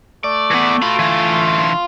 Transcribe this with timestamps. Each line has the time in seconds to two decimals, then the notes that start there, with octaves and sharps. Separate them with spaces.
0.24 A3 D5
0.51 E3 B3
0.82 F4 F#4 B5
0.99 D3 E3